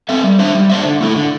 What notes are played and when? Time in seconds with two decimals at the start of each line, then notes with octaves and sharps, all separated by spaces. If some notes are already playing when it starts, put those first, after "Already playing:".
0.09 C4 A4 E5
0.24 G3
0.39 D4 C5 E5
0.55 G3
0.70 D4 C5 E5
0.86 D3
1.01 A3 E4 A4
1.16 D3